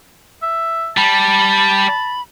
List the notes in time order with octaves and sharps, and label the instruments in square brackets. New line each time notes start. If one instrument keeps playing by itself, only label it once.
[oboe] E5
[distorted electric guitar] G3 [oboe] A5 [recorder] B5